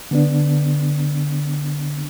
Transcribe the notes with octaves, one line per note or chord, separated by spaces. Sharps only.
D3 B3 D4